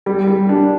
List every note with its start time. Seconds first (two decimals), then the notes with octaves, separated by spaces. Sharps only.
0.06 G3
0.27 G3
0.49 D4